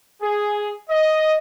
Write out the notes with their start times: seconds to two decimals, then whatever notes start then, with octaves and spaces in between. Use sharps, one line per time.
0.21 G#4
0.89 D#5